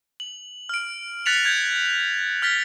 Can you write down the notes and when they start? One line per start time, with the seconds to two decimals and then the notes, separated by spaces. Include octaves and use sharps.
0.20 F#7
0.69 F6 D7
1.26 F#6 A6 B6 C#7 F7 F#7
1.45 G6 G#6
2.42 F6 A6 B6 G7